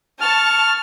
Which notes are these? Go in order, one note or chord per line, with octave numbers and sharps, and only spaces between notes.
A5 C#6 F6